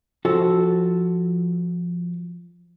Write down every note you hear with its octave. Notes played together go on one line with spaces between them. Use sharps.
F3 F#4 A4